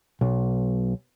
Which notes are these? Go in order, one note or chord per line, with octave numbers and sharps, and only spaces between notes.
B1